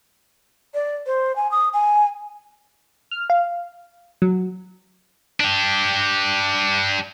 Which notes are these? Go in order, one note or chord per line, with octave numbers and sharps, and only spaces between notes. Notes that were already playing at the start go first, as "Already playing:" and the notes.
D5
C5
G#5
D#6
G#5
F6
F5
F#3
D4 G4